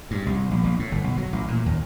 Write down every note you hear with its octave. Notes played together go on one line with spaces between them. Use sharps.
G2
C2
A#1
A#1
A2
G1
B1
F#3
A1
A#2
D#2